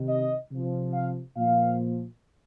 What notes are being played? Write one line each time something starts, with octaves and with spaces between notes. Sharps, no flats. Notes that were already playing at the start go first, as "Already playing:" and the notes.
Already playing: C3 D#3
D#5
C3 F3
F5
A#2 F3 F5